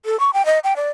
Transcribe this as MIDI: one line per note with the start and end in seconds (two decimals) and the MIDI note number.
0.05 0.19 69
0.20 0.31 85
0.34 0.45 79
0.45 0.59 75
0.64 0.74 79
0.76 0.90 74